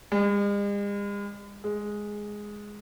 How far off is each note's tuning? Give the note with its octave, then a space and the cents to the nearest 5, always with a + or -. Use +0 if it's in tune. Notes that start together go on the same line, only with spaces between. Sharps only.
G#3 -45
G#3 +0